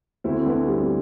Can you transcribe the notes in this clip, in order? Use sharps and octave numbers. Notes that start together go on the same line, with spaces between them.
D2 C4 E4
D2 B3 D4
G3 C4